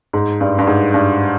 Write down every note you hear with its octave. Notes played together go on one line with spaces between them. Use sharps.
G#2
G2
G2
G#2
G2